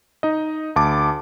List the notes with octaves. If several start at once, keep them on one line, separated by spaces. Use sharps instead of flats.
D#4 D#5
D2 A5 D6